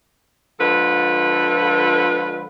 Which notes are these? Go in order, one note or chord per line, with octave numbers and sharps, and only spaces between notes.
D3 F3 G#3 F4 A4 B4